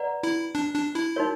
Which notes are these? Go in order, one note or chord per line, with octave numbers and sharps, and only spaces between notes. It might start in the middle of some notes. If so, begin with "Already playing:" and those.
Already playing: B4 D5 F#5 A#5
E4
D4
D4
E4
D#4 F#4 A#4 C#5